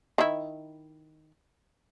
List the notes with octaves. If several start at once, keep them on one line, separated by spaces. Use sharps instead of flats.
D#3 E4